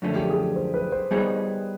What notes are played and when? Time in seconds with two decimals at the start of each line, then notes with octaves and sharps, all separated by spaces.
0.02 F#2 D3 F3 A3 C#4
0.16 G4
0.30 G#4
0.56 C5
0.74 B4
0.92 C5
1.11 G3 B3 D#4 G#4 C#5